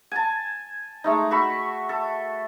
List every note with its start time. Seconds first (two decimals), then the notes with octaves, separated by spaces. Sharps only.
0.11 G#5 A5
1.04 G#3 A3 D#4
1.31 F#4 E5 B5 C#6
1.89 A4